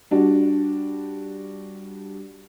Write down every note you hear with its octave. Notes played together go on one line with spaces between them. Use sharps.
G3 D4 F#4